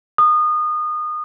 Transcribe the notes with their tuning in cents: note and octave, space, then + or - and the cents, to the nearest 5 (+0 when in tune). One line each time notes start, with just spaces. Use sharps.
D#6 -25